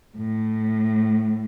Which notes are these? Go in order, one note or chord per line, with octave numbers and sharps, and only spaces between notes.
A2